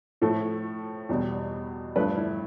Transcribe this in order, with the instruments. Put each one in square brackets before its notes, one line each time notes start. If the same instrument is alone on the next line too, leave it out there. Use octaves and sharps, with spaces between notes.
[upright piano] A2 F3 A3 A4
E2 B2 G3
G2 F3 A3 B4
E4